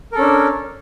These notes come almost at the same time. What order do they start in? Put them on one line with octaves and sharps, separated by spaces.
A#4 A4 C#4 D4